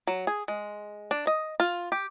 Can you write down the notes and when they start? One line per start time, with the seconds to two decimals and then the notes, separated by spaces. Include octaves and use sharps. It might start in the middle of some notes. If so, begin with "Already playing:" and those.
0.07 F#3
0.27 G#4
0.48 G#3
1.11 D4
1.27 D#5
1.60 F4
1.92 G4